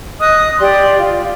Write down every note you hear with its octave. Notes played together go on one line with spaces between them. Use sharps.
D#5 D#6 F#6
G4 D5 C6
F4